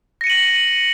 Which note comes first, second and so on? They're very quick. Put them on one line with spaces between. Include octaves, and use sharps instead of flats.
A#6 C#7 D#7 F#7